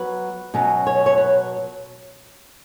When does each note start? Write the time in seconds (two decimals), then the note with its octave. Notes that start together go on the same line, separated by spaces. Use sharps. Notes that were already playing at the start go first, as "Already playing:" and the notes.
Already playing: F#3 B3 B4
0.54 B2 F#3 C#4
0.87 C#5
1.06 C#5
1.18 B4